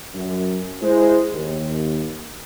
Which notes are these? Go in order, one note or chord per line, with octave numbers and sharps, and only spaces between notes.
F#2
G#3 E4 C5
D#2